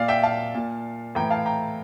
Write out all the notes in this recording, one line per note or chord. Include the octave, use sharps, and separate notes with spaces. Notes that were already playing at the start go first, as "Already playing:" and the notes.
Already playing: A#2 D5 F5
E5 G5
F5 A5
A#2
A2 E3 G5 A#5
F5 A5
G5 A#5